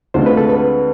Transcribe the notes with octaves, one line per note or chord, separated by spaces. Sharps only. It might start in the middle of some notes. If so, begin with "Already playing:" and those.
D2 D3 G#3 C4 F4 C5
B4
A4
B4